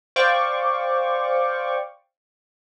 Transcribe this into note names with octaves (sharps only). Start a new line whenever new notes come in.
C5 D5 F5 G5 C#6 D6